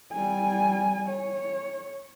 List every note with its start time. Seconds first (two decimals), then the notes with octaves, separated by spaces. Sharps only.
0.12 G3 G#5
1.08 C#5